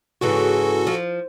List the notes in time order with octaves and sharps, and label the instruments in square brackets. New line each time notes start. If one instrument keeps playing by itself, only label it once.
[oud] G#2 C#3 E3 [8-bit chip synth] F#4 A4
[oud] F3